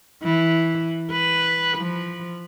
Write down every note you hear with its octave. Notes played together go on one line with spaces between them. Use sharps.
E3
B4
F3